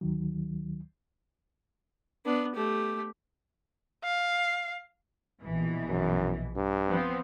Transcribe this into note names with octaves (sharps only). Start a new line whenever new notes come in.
D2 D#3 F#3
B3 D4
A3 G4
F5
A#1 B2 E3
F#2
G2
F3 B3 C4